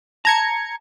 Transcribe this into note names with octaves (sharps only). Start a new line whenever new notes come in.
A5 A#5 G#6 C#7